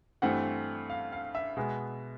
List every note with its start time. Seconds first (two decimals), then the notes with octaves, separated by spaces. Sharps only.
0.22 G2 E3 A3 C4 F#5
0.90 F5
1.12 F5
1.35 E5
1.57 B2 G#3 B3